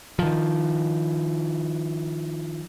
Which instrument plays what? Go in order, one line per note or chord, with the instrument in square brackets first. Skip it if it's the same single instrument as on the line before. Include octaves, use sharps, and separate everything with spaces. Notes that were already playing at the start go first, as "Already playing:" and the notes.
[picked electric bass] D#3 F3